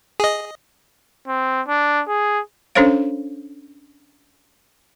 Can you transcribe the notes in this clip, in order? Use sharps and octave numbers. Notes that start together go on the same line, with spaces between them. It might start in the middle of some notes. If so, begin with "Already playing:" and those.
G#4 D#5
C4
D4
G#4
C#4 D4 A4 C5 C#5 F5